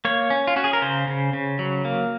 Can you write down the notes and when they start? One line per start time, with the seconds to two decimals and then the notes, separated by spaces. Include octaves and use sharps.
0.05 A#3 C#5
0.30 C#4
0.47 F4
0.56 C#4 F#4
0.64 G#4
0.73 A#4
0.82 C#3 C5
1.08 C#3
1.33 C#3
1.59 F#3
1.85 A#3